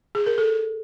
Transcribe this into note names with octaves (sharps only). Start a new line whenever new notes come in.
G#4
A#4
A4